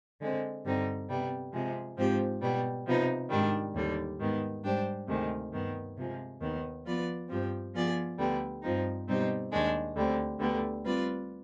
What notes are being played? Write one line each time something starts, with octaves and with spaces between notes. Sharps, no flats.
D3 G#3 C4
G2 D3 G3 C4 D#4
C3 G3 B3
C3 F3 G#3
G#2 F3 C4 G4
B2 G3 B3
C3 F3 B3 D#4
G#2 D#3 G3 D4
D#2 D3 G3
G#2 D#3 B3
G#2 G3 D4 G4 C5
D2 C3 D#3 G#3
G2 D#3 B3
C3 F3 G#3
D#2 D#3 B3
F3 B3 F4 B4 D5
G2 F3 C4 G4
F3 B3 F4 G#4 D5
D2 D3 G3 B3
G2 F3 C4 D#4
B2 G3 C4 D#4 G4
D#2 D#3 G#3 D4
D2 D3 G3 C4
D2 D3 G3 B3
G3 C4 F4 B4 D5